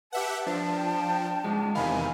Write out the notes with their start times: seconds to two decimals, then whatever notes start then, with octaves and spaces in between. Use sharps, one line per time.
0.12 G4 B4 E5 F#5 A5
0.47 F3 D4 C5
0.77 G5
1.44 G#2 F3 G#3
1.75 E2 C3 D#3 F5 G#5 B5